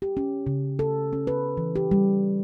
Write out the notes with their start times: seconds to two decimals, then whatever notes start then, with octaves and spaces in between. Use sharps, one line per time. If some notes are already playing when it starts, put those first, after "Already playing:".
0.02 G4
0.17 C#4
0.47 C#3
0.79 A4
1.13 C#4
1.27 B4
1.57 E3
1.76 G4
1.91 G3